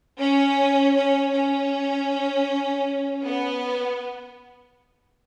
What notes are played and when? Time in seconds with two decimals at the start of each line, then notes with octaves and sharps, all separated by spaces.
0.20 C#4
0.96 C#4
1.34 C#4
3.26 B3